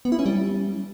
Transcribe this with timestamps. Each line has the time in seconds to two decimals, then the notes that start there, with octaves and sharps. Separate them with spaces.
0.05 B3
0.12 E4
0.19 C#4
0.26 G3